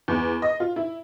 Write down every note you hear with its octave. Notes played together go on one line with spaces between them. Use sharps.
E2
D#5
F4
E4